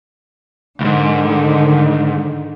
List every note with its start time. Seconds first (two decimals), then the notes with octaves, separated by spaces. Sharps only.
0.80 C#2 G#2 D3 D#3